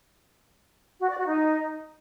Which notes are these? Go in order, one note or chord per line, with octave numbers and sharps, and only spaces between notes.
F#4
D5
F#4
D#4